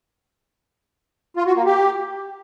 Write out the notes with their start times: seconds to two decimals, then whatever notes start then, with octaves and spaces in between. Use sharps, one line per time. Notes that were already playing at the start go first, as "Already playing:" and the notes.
1.36 F4
1.46 F#4
1.56 A#3
1.66 G4